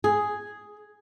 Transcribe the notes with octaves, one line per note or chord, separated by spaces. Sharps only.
G#4